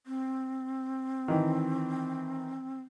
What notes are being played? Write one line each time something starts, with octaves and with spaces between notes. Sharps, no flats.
C4
D#3 E3